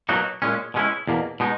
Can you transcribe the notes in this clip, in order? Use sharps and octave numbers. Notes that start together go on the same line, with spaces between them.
B2 F#3 A#3 D#4 F#4
A#2 G#3 C#4
B2 G#3 C#4 E4
E2 B2 A#3
B2 G#3 D#4